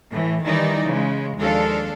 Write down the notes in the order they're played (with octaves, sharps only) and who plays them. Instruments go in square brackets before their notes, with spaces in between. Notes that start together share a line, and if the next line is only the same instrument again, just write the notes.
[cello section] A2 E3
D#3 E3 G3 D#4 D5
C#3 G#3
D#2 F3 G#3 D4 A4 F5